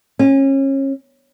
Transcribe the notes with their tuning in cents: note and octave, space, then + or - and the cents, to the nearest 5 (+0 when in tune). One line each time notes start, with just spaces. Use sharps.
C#4 -30